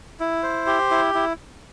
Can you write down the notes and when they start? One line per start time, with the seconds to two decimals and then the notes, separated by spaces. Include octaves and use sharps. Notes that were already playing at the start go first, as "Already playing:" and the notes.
0.20 E4
0.43 C5
0.67 G4
0.91 E4
1.14 E4